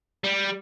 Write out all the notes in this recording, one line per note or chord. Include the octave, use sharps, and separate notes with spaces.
G3